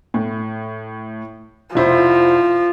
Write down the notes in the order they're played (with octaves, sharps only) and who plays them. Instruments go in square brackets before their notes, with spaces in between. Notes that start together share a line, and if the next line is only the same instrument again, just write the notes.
[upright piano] A2
[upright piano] F1 E4 C5 [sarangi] F3